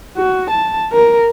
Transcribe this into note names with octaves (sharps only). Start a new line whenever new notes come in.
F#4
A5
A#4